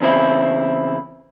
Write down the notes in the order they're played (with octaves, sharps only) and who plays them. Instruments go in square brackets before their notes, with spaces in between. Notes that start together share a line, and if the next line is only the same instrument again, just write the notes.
[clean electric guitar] E2 C#3 C4 E4